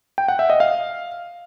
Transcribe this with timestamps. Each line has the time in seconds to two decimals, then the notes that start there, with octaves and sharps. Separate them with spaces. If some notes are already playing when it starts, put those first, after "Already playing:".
0.18 G5
0.28 F#5
0.39 E5
0.50 D#5
0.60 F5